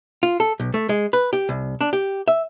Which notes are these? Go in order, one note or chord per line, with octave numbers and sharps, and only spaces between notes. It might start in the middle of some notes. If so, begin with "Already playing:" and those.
F4
A4
B1
A3
G#3
B4
G4
C2
D4
G4
E5